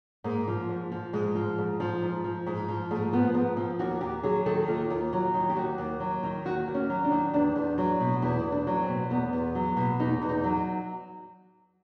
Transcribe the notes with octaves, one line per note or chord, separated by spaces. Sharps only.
G#2 A#3
F3
G#2
F3
G#2 G#3
F3
G#2
F3
G#2
F3
G#2
F3
G#2 A3
F3 B3
G#2 B3
F3 C4
D#2 F#4
D#2 G4
F#3 G#4
D#3 A4
D#2 F4
D#2
F#3
D#3
G4
D#2 F#4
D#2
F#3
D#3
D#2 F#4
D#2
C#4
F#3
D4
D#3
E2 D4
E2
F#3
B2
E2 E4
E2
D4
F#3
C4
B2
E2 B3
E2
F#3
B2
E2 D#4
E2
D#4
F#3